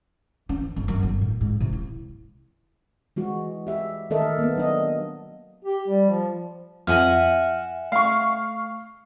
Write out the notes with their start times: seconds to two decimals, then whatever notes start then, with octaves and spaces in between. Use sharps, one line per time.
0.49 C#4
0.61 E3
0.76 G1
0.88 F#2
1.03 G1
1.21 A2
1.41 G#2
1.60 C3
1.73 E4
3.16 E3 G#3 F#4
3.67 G4 E5
4.10 D#3 A3 A4 A#4 D#5 E5
4.39 A#3 B3
4.56 F#3 D4 D#5
5.65 G4
5.88 G3
6.10 F3
6.87 F2 E5 F#5 G#5 F6 A#6
7.92 A3 F5 C#6 C7